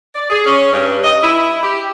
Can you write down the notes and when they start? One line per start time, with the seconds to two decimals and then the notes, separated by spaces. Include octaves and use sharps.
0.15 D5
0.30 G#4
0.46 C#4
0.73 G2
1.04 D#5
1.23 E4
1.63 G4